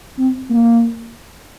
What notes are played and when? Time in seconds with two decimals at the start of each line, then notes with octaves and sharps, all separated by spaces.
0.18 C4
0.50 A#3